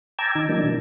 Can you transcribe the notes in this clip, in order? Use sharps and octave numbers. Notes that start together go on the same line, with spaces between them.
G5 A5 A#5 D6 E6 G#6
D#3 D#4
E3 F#3 A#3 D4 D#4
B2